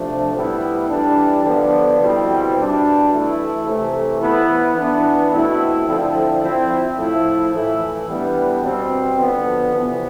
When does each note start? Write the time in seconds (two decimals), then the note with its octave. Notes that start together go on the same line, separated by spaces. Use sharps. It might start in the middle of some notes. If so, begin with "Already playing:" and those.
Already playing: C3 F3 A3 D4
0.34 A2 G3 B3 E4
0.89 E3 G3 D4
1.44 D3 F3 B3 D4
2.00 B2 G3 C4 E4
2.55 B2 G3 D4
3.10 E3 A3 E4
3.65 C3 E3 A3
4.20 E3 B3 E4
4.75 E3 B3 D4
5.31 B2 A3 C4 E4
5.86 D3 F3 C4 E4
6.41 F3 C4 E4
6.97 A2 F3 A3 E4
7.52 A2 E3 A3 E4
8.06 E3 G3 B3 D4
8.62 B2 G3 C4
9.17 D3 F3 B3
9.72 C3 E3 B3